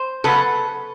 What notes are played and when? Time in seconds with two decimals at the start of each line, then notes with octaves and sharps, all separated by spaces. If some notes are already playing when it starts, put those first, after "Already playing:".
Already playing: C5
0.24 C#3 F#3 B3 A4 B4